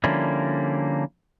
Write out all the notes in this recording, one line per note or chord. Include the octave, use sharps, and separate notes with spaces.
D3 F3 G3 A#3 C#4 E4